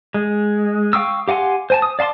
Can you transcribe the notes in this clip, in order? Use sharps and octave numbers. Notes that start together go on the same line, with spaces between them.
G#3
F5 G5 C#6 D#6 E6
G4 F5 F#5 G#5 C6
C5 G#5 A5
D#6
D5 F5 A5 C6 D6